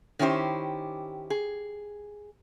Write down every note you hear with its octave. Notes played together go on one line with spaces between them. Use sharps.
D#3 C#4 E4 G4 C5
G#4